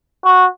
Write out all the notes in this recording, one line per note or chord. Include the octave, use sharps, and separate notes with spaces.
F#4